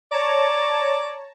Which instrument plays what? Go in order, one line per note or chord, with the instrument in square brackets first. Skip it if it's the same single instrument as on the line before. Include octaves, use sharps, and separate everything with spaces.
[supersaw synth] C#5 A5 A#5 [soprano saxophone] D5